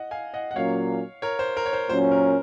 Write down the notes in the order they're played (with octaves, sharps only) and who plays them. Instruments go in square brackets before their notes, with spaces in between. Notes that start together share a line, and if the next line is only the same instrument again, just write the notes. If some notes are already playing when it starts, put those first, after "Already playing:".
Already playing: [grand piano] D#5 F#5
F5 G#5
D#5 F#5
F#5
[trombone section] A#2 F#3 A#3 C#4 [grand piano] C#5 F5
[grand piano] A#4 C#5
C5
A#4
C#5
C5
[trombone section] A#2 F#3 C#4 [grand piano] C5
[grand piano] A#4